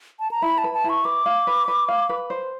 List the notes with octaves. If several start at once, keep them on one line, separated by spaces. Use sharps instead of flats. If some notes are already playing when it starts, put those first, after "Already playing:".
A5
A#5
E4 B5
A5
B4
A5
E4
C#6
B4 D6
F5
B4
B4
F5
B4
C5